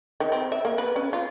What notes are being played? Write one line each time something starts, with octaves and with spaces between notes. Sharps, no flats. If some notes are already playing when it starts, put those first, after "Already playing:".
D#3
C4
E5
A#3
B4
C#4
F4